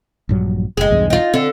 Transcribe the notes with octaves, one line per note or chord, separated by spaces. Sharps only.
A#1 G2 F#3
F#1 G#3 G#4
B1 E2 G2
D#4 F4
D3 C4